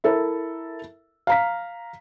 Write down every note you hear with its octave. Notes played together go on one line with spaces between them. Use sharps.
E4 A4 A#4 E5
F5 A#5 B6